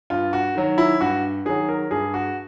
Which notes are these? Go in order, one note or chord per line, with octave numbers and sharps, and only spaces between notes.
G2 F4
F#4
D#3 F#3
E4
G2 F#4
D#3 F#3 G#4
A#4
G2 G#4
F#4